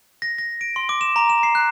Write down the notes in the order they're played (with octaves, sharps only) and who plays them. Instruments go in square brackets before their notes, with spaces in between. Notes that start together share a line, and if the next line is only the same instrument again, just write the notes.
[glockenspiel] A#6
A#6
D7
C6
D6
E7
A#5
E7
C7
F#6